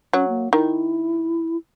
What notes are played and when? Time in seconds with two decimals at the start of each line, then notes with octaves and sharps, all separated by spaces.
0.13 F#3 C#4
0.28 A#3
0.53 D#3 E4